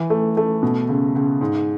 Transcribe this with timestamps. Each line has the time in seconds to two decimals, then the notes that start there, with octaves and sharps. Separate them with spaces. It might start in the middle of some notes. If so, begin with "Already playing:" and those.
Already playing: E3
0.10 A3
0.37 A3
0.63 B2
0.88 C#2
1.15 C#2
1.41 G#2